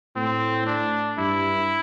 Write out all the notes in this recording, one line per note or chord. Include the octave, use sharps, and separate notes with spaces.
A2 C4
D4
G2 E4